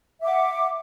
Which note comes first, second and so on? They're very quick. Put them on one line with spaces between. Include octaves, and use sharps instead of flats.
E5 D6 F#5